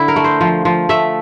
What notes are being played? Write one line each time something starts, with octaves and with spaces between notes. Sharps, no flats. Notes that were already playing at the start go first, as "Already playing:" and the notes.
Already playing: D3 E4
A#4
A3
C5
F3
F3
A3 E5